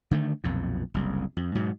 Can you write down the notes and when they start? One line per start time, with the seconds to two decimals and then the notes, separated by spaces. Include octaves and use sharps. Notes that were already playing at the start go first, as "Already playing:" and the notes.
0.11 D3 D#3 A3
0.44 B1 F2 A#2
0.94 F#1 C2
1.37 F2
1.55 G#2 B2 F#3